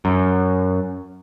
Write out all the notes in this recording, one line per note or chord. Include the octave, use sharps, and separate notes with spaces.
F#2